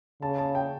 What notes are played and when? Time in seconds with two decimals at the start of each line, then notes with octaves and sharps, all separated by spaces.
0.22 C#3 A5
0.38 A5
0.55 G5